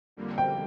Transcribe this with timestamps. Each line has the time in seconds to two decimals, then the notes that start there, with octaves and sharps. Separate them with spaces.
0.17 F2 D3 G3 A#3
0.38 G5